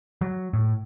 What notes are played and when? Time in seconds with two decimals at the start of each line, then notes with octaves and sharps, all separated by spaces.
0.21 F#3
0.53 A2